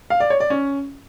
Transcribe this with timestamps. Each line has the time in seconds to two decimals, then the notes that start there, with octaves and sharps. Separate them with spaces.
0.10 F5
0.20 D5
0.30 C#5
0.40 D5
0.50 C#4